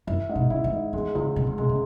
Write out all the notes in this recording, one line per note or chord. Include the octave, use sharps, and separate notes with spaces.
F#2 E4
G#2
B2
C#3 E4
E3
G#2
E3 G#3
C#2 E3
C#3 G#3
C#3
B2 G#3
C#3